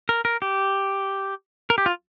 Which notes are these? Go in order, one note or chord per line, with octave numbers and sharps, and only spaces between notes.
A#4
A#4
G4
A#4
G4
F4